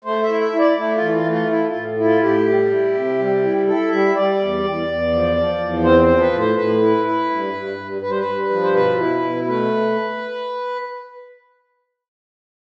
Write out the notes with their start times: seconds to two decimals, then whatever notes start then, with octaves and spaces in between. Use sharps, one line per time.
0.05 A3 C5
0.23 E5
0.29 E4
0.41 E5
0.53 E4
0.59 D5
0.77 A3 E4
0.95 F4
1.01 E3
1.13 F4
1.25 A3
1.31 F4
1.49 E4
1.68 F4
1.74 A2
1.97 E4
2.04 F4
2.22 A2 G4
2.46 G3
2.70 E4
2.95 C3
3.19 G3
3.43 E4
3.67 E4 A4
3.91 G3 E5
4.15 G3 D5
4.39 E2
4.64 E2
4.88 E2
5.12 F3
5.36 F3
5.60 E2
5.84 C4 C5
6.02 C5
6.08 F3
6.21 B4
6.33 A2
6.38 C5
6.57 A2 B4
6.81 E4
7.05 E4
7.30 G2
7.53 G2
7.78 G2
8.02 G2 B4
8.11 C5
8.19 B4
8.26 G2
8.50 F3
8.63 C5
8.74 B2 B4
8.98 E4
9.22 B2
9.46 A3 B4